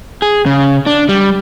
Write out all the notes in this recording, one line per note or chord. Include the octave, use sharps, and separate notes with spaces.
G#4
C#3
D4
G3